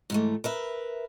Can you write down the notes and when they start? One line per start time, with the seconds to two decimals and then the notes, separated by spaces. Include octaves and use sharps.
0.10 G#2 E3 A3
0.44 A#4 B4 E5